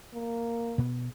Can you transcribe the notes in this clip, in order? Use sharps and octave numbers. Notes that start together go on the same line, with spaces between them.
A#3
B2 B3